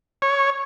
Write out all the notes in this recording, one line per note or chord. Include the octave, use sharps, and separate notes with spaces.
C#5